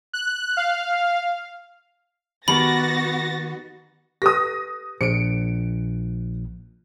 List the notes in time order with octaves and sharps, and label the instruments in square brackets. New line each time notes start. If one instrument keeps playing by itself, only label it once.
[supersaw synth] F#6
F5
[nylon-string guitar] D#3 G4 A5 [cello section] B3 F#4 [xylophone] B5 [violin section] A6 A#6
[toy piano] G4 A4 B4 [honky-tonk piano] D#6 A#6
[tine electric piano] A#1 [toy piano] G#4 C5 [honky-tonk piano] C#7 D7